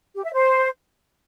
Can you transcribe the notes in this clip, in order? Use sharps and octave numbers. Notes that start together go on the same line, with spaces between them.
G4
E5
C5